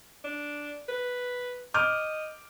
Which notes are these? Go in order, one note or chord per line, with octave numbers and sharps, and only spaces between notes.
D4
B4
D#5 D6 F6 G6